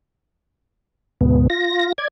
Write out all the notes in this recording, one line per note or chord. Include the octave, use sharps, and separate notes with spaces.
D2 G#2 B2 B3
F4 A#6
D5 G#6